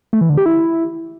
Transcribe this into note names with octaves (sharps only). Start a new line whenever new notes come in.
A3
E3
D3
G4
E4